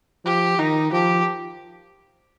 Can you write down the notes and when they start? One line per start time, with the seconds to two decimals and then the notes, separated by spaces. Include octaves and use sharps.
0.25 F3 G4
0.58 D#3 D#4
0.92 F3 G4